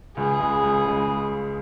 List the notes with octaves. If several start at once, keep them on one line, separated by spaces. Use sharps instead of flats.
C#2 G#4
C#3 G#3
C#2
C#3 G#3